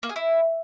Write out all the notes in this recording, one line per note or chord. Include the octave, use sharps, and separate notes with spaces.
A#3
G#4
E4